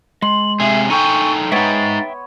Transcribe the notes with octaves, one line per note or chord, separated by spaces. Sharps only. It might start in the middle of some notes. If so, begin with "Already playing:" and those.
G#3 C6 F#7
C3 G#4 E5
D#4 A4 G5 G#5 C#6
G#3 B3 D#4 C#5 E5 G5 A6